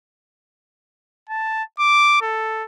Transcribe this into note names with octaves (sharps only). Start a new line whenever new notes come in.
A5
D6
A4